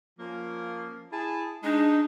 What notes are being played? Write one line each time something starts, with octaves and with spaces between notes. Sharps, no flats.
F3 A#3 C#4
E4 G#4 A5
G#3 D4 D#4